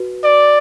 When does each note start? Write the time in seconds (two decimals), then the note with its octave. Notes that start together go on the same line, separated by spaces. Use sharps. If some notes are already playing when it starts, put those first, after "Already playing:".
Already playing: F#4 B4
0.24 D5